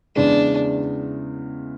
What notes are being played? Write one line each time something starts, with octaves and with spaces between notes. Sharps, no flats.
E2 C#3 E3 G#3 D4